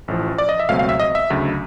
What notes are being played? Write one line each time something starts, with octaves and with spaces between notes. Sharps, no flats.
A1 A2 F3
D5
D#5
E5
C#2 B2 F#3 A3 C4 F5
F5
E5
D#5
E5
D2 C#3 F#3